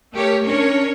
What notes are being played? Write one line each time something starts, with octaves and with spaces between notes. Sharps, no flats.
A3 G4 A#4 C#5
C#4 D4 A#4 C#5